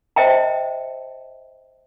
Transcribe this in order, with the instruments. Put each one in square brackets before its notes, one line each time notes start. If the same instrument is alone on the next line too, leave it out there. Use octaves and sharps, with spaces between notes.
[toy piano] C5 D#5 E5 G5 A5